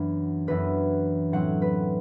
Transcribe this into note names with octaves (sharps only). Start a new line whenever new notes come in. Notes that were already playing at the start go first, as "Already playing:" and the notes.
Already playing: F#2 E3 B3 D4
F#2 E3 B3 D4 B4
A2 F#3 C4 F#5
B4